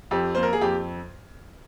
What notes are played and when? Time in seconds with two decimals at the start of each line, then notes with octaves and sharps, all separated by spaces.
0.11 F2 G4
0.35 A#3 C5
0.43 A#4
0.53 G#4
0.61 F2 G4